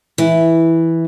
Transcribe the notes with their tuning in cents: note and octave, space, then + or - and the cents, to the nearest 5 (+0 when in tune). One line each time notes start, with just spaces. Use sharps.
E3 -5